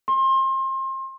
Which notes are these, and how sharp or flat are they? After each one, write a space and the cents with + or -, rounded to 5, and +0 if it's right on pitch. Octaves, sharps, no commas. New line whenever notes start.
C6 +30